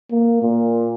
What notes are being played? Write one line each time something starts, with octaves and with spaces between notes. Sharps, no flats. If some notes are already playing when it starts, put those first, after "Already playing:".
A#3
A#2